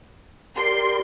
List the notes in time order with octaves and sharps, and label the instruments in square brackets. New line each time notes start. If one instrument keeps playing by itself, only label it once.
[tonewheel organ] G4 A#4 D5 [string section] C6